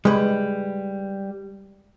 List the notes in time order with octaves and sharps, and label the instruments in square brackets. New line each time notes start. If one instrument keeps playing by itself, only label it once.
[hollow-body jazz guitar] G3 B4 [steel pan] G#3